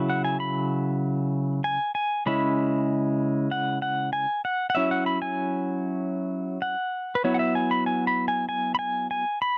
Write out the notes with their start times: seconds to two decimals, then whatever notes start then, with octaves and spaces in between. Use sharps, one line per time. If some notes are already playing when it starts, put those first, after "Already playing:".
Already playing: C#3 F#3 E4
0.10 F#5
0.25 G#5
0.40 B5
1.64 G#5
1.95 G#5
2.26 C#3 G#3 C#4 E4 B5
3.51 F#5
3.82 F#5
4.13 G#5
4.45 F#5
4.70 F#5
4.75 F#3 C#4 E4 E5
4.91 F#5
5.06 B5
5.22 G#5
6.62 F#5
7.15 B4
7.24 F#3 B3 E4 C#5
7.34 F#5
7.39 E5
7.55 G#5
7.71 B5
7.86 G#5
8.07 B5
8.28 G#5
8.49 G#5
8.75 B5
8.79 G#5
9.11 G#5
9.42 B5